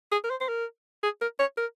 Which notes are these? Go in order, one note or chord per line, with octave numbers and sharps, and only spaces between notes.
G#4
A#4
C5
C5
A#4
G#4
A#4
C#5
A#4